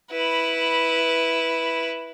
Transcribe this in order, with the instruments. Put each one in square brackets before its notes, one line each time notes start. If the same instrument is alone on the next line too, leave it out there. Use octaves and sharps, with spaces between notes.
[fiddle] E4 B4